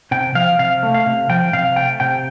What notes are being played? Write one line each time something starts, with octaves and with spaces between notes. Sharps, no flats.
C3 G5
F3 F5
C3 F5
A3
F5
C3
F3 G5
C3 F5
A3 G5
C3 G5